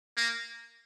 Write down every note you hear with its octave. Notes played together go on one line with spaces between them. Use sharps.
A#3